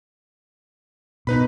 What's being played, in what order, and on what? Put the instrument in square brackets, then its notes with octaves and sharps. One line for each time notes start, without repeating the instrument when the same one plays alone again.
[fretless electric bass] B2 [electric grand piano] D#4 B4 B5